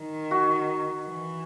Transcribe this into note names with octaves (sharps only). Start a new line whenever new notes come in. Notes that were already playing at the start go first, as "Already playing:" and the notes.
Already playing: D#3
F#4
E3